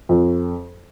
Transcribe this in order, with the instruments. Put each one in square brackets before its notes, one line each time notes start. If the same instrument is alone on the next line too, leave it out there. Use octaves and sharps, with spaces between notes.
[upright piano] F2